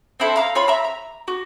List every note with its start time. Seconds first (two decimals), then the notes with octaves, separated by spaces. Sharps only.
0.20 C4 D4 E4 A4
0.36 F5 A#5 E6
0.55 F4 C#5 B5
0.67 E5 A#5 E6
0.84 A#5
1.28 F#4